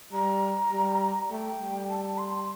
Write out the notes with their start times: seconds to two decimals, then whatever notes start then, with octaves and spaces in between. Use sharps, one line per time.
0.12 G3 A#5
0.72 G3
1.31 A3 G5
1.60 G3
1.89 A5
2.18 C6